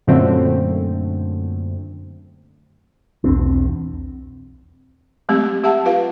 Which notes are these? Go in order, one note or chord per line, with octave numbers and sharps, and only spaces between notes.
F#2 A#2 D3 A3 C4
B1 E2 C4 D4
F#3 G#3 A3 C4 G4
G4 E5 F#5 A5
F4 B4 F5